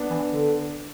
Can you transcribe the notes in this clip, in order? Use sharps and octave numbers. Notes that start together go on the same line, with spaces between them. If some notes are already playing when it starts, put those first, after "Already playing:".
Already playing: B3 D4
E3
D3